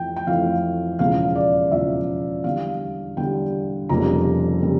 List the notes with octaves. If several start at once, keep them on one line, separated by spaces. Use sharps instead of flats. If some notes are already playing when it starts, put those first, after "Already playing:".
Already playing: F2 E3 A3 G5
G5
F2 E3 A3 F5
E1 E2 C#3 F3 F5
D5
E1 E2 C#3 F3 E5
E2 D3 G3 F5
E2 D3 G3 G5
F1 F2 C#3 G3 A#3 A#5
C#3 G3 A#3